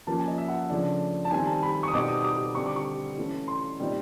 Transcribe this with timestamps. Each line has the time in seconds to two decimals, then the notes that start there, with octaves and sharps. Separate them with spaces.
0.07 F3 A#3 C#4 A5
0.17 G#5
0.28 D#5
0.38 E5
0.48 F#5
0.69 C#3 F3 A3 D4
1.25 A5
1.31 D#3 G3 C4 G#5
1.47 A5
1.63 B5
1.83 C#6 D#6
1.93 B2 G3 C4 D#4 D6
2.09 D#6
2.21 D#6
2.24 D6
2.55 D3 G3 C4 C#6
2.66 D6
2.76 C#6
3.17 E3 A3 C#4
3.48 C6
3.79 A#2 G3 C4 D#4